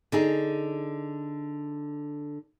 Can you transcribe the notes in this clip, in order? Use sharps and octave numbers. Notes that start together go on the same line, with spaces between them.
D3 D#4 G#4